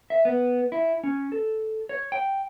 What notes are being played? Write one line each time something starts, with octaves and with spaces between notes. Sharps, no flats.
E5
B3
E4
C#4
A4
C#5
G5